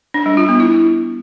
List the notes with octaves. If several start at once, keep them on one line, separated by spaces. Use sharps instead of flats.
D4
G3
F4
B3
E4